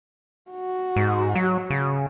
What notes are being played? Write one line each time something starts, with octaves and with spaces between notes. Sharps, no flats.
F#4
G#2
F#3
C#3